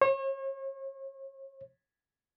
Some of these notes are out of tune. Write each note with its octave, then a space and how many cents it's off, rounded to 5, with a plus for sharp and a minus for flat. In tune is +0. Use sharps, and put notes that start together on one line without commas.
C#5 -40